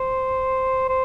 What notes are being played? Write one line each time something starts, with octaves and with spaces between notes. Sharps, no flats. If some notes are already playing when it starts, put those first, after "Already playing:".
Already playing: C5
C5